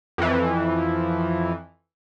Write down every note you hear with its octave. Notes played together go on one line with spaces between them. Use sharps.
F2 E3